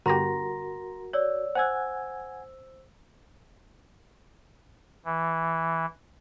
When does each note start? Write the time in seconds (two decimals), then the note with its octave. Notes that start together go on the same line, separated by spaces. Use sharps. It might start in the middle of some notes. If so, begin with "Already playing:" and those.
0.06 G1 F#4 G4 A#4 A#5 C6 A#6
1.13 C#5 D5 E6
1.55 C5 F#5 G#5 E6 G#6
5.05 E3